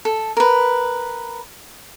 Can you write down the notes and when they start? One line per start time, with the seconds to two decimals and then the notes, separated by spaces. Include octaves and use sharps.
0.05 A4
0.37 A#4 B4